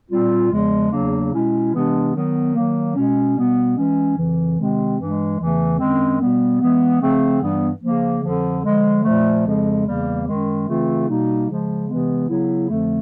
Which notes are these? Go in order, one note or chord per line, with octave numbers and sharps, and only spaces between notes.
A#2 G3 C4 F4
E2 C#3 F3 G#3
E2 C#3 F#3 A#3 D4
B2 G#3 C#4 E4
C3 E3 G#3 B3 D4
D#3 F#3 B3
D#3 F#3 A#3
B2 G#3 C#4
B2 G3 B3
E3 G#3 C#4
F2 C#3 E3
C3 D#3 G#3 C4
G2 E3 G#3
E2 C#3 E3 A3
F#2 D#3 G#3 C4
B2 G3 B3
E3 G#3 B3
C#3 F3 A3 C4
G2 E3 G3 B3
C#3 F3 A#3
F2 D3 F3
D3 F3 G#3
A#2 F3 A3
F2 C#3 F3 G#3
E2 C#3 E3 G3 A#3
F#2 D#3 G#3
C#3 E3 A3 C4 F4
B2 G3 A#3 D#4
C#3 F3 G#3
C3 E3 G#3 B3
C#3 F#3 B3 E4
F2 D3 F3 A3